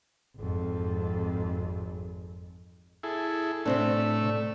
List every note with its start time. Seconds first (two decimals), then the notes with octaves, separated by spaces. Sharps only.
0.37 G#1 F2
3.03 E4 G#4 A4
3.65 A2 C3 A3 C4 D4 E6